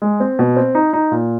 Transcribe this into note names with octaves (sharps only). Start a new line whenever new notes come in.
G#3
C4
B2
C4
D#4
D#4
A#2